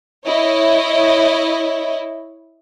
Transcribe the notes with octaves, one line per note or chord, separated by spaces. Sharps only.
E4 C#5 D#5 E5